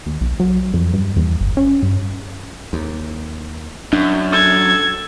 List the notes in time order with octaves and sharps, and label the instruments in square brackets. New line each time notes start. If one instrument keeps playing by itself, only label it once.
[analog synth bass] D#2
B1
F#3
F2
G2
E2
G1
C#4
G2
[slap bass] D#2
[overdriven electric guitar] F#2 [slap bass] D4
[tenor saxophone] A4 [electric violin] G#6